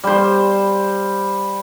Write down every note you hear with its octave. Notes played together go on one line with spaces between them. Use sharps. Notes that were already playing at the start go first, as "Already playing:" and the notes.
G3 C5